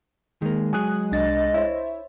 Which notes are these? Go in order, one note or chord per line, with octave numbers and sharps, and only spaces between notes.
D#3 G#3 A#3
F#3 G#4 G#5 D#6 F#6
C2 D4 D#5 A6
E4 C5 C#5 E5